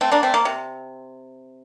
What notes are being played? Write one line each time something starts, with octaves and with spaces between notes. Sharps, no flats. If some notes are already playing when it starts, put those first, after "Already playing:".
A3 C4
A#3 D4
A3 C4
A#3
C3